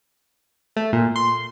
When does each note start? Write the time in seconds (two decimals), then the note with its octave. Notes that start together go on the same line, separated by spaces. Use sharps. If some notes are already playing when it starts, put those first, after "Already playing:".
0.76 A3
0.93 A#2
1.16 C6